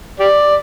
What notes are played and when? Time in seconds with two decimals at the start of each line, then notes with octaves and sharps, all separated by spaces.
0.20 G4 D5